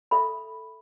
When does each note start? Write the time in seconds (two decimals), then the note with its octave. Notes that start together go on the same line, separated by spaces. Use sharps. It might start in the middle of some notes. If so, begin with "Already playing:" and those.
0.11 A4 E5 B5